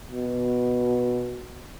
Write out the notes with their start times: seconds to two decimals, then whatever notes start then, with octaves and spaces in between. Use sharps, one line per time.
0.10 B2